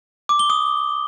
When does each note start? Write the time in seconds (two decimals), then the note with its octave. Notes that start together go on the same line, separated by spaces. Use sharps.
0.29 D6
0.39 G7
0.50 D#6